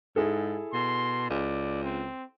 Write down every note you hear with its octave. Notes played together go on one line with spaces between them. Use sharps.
G#2 E4 G#4 A4
B2 C6
C#2 D5
C4